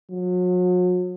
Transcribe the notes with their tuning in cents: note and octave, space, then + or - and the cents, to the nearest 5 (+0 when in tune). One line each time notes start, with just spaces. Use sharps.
F#3 -40